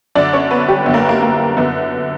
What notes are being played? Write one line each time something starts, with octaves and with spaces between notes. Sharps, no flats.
F#2 D3 D4 D5
C#4 C#5
B3 B4
G3 G4
F#2 D3 B3
A#3
A#3
A#3
F#2 D3 B3